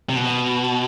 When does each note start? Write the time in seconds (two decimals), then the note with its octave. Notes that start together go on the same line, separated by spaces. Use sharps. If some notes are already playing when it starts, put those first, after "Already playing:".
0.09 C3
0.16 B2